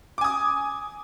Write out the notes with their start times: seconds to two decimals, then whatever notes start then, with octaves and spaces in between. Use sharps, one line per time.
0.18 D6
0.21 G#5
0.24 D#6